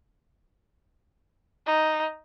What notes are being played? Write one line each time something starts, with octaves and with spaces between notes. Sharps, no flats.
D#4